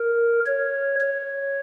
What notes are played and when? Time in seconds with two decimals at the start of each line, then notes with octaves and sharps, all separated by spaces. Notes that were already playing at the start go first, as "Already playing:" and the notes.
Already playing: A#4
0.46 C#5
1.00 C#5